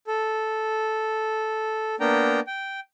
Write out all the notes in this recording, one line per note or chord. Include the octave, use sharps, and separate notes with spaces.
A4
A#3 B3 D4 G5 A#5
G5